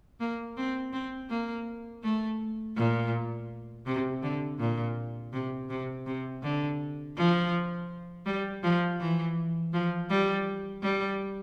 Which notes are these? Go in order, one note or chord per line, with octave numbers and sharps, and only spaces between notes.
A#3
C4
C4
A#3
A3
A#2
C3
D3
A#2
C3
C3
C3
D3
F3
G3
F3
E3
F3
G3
G3